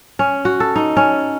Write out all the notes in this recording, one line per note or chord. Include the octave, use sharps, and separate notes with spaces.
C#4
F#4
A4
D#4
C#4